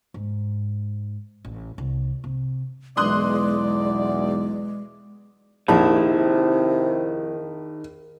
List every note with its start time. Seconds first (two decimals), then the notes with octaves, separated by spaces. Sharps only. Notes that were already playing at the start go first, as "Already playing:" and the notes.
0.14 G#2
1.45 A1
1.78 C2
2.24 C3
2.97 B1 E2 G#3 D5 C6 D#6 F#6
5.68 A#1 F2 C3 D#3 E4 C5